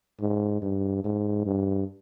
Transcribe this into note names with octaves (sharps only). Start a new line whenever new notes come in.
G#2
G2
G#2
G2